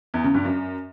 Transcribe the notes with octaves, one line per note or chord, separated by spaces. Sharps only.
E2
C#3
G2
F#2